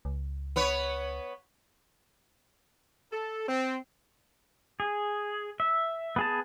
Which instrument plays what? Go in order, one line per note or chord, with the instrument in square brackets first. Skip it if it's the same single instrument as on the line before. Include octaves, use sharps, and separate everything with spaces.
[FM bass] C#2
[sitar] B3 B4 C#5
[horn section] A4
C4
[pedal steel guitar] G#4
E5
B3 G#4 A5